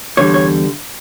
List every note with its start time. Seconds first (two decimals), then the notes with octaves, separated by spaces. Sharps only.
0.17 E2 D3 G3 C#5
0.34 C#5